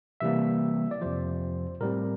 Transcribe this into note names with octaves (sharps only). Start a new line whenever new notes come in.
C3 E3 G3 A#3 E5
D5
F2 C3 F3 C5
A2 G3 C4 A#4